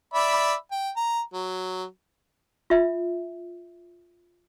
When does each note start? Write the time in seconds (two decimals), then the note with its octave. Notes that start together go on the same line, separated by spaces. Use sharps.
0.14 D5 E5 B5
0.71 G5
0.96 A#5
1.33 F#3
2.70 F4 E5